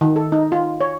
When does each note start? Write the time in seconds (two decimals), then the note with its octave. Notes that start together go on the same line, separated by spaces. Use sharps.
0.01 D#3
0.16 A4
0.32 D#4
0.52 F4
0.81 C#5